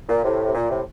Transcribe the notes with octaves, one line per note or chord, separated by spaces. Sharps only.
A#2
A2 C3
C3
A#2
A2 C3